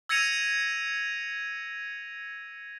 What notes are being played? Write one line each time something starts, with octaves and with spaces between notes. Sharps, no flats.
E6 G#6 A#6 C#7 D#7 F7